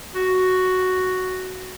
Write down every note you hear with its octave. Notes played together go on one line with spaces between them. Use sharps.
F#4